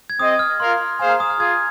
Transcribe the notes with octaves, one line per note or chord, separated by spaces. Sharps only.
G#6
C4 G#4 D#5 D#6
F6
F4 A#4 F5 C6
A#3 G#4 C5 F5 G#5
A#5
D#6
F6
F4 G#4 G#6